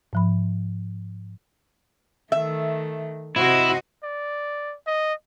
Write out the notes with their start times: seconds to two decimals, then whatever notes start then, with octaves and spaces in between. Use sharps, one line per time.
0.13 G#2 F3 B5
2.32 D#3 A3 E5
3.36 C3 E4 F#4 C5 D#5
4.03 D5
4.87 D#5